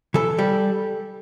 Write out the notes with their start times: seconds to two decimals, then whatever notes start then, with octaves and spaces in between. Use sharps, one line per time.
0.14 E3 A4
0.38 G3